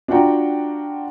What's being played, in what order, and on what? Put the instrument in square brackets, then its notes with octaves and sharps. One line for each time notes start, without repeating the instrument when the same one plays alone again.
[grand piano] D4 F4 F#4 F#5 G5 A#5